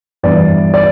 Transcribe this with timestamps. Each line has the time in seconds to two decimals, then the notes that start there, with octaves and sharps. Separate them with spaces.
0.23 G2 E3 B3 D5
0.74 D5